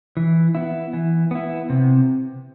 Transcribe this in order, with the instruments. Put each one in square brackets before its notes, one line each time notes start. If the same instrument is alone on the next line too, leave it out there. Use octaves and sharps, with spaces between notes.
[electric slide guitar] E3
B3 E4
E3
B3 E4
C3